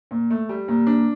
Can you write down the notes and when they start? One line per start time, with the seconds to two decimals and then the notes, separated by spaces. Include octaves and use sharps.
0.11 A#2
0.30 A3
0.49 G3
0.68 A#2
0.87 D4